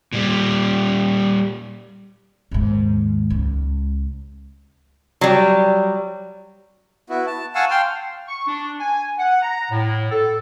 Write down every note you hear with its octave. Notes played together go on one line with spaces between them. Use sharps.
A#2 G3
D#2 G#2
C#2
F#3 G3
B3 E4 F#4
A5
F5 F#5 G#5 A5 C#6 E6
F5 G5 C6 F6
C#6
D4
G#5
F#5
A#5
A2
A4